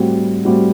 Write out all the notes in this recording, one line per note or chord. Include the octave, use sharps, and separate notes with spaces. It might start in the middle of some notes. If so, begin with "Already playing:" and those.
Already playing: A2 G3 C4 F#4
A2 G3 C4 F#4